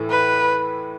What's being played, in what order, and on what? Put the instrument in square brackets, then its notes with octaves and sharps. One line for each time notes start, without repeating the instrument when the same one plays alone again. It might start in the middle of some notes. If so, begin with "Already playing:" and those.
Already playing: [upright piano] A2 E3 A3
[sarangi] B4